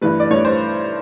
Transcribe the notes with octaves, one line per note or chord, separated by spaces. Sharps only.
G2 E3 A3 B4
D5
G2 E3 A3 C#5
C5